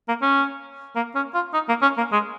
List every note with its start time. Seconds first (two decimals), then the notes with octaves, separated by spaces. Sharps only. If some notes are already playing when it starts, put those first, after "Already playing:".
0.08 A#3
0.22 C#4
0.96 A#3
1.15 C#4
1.34 F4
1.54 D#4
1.69 A#3
1.82 C#4
1.98 A#3
2.12 G#3